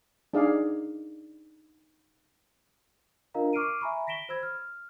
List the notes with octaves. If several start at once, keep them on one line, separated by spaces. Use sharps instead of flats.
D4 D#4 G#4 D5 F5
D4 F4 A#4 D#5 F5 A#5
C#6 D6 F6 C7 D7 D#7
E5 G#5 A#5 B5 C#6
A#6 B6 D7 E7 G7
C5 B5 E6 G#6
F6